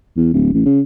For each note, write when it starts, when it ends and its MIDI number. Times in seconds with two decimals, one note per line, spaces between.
0.17 0.31 40
0.33 0.52 26
0.53 0.62 33
0.65 0.81 49